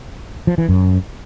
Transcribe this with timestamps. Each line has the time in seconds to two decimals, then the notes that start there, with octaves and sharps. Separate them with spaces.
0.47 F3
0.58 E3
0.69 F#2